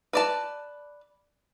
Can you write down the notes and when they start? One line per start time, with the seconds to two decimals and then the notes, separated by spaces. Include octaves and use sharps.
0.13 B4 D5 A5